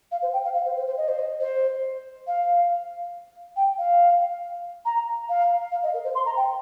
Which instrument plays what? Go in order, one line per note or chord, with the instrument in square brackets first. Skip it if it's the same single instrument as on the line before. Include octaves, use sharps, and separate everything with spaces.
[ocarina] F5
C5
G5
F5
F5
C5
C5
C5
D#5
C5
D#5
C5
F5
G5
F5
A#5
F5
F5
D#5
A#4
C5
C6
A#5
G5